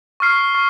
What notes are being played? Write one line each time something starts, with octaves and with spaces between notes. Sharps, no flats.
C#6 F6 C7
C#6